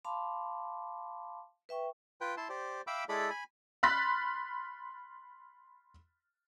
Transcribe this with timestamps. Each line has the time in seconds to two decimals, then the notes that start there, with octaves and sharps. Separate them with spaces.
0.05 F5 A5 B5 C6 D6
1.69 B4 E5 G5 C#6
2.21 F4 B4 G5
2.37 E4 A5 C6
2.49 G4 C5 D5
2.87 E5 F5 G5 B5 D6 E6
3.09 G#3 E4 G#4 A4 D5 B5
3.30 G#5 B5
3.83 B5 C6 F6 F#6 A6 B6